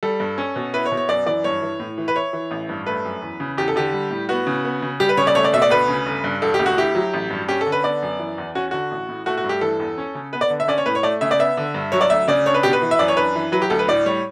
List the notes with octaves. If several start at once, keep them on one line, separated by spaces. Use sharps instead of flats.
G3 A4
G2
C#4
B2
E4 B4
C#5
B2
C#5
F#2 D5
E3 D5
G2 C#5
E3
A2
E3
B4
E4 C#5
E3
A1
G2
A3 B4
F#2
E2
C#3
E2 G4
A4
D3 G4
G3
A2
B3 F#4
C#3
B3
C#3
G3 G4
B4
C#3 C#5
D5
A3 C#5
D5
B2 E5
D5
D2 B4
C#3
G1
G2
E1 A4
G4
D2
F#4
E4 G4
F#3
A1
G2
C#4 G4
A4
D3
B4
B3 D5
F#2
E3
E2
C#4 F#4
D3 F#4
A1
A2
A3 F#4
F#4
G2
G4
E3 A4
E2
C#4
C#3
B3 B4
D5
D3
E5
C#4 D5
C#5
A2 B4
C#5
A3 D5
C#3 E5
D5
B3 E5
D3
G2
F#3 C#5
D5
D2 E5
C#3 D5
D4 C#5
B4
B2 G4
B4
E3
E5
F#2 D5
C#5
D4 B4
E3
F#3 B4
G4
D2 A4
B4
A2 D5
G3 C#5